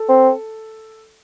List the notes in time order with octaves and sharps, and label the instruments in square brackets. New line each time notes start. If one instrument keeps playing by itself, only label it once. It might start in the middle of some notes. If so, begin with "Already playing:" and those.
Already playing: [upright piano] A4
[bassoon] C4